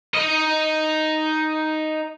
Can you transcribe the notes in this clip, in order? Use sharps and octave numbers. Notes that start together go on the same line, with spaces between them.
D#4 D#5